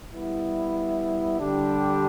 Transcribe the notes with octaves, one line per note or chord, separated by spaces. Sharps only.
G3 B3 E4
D3 G3 D4 G4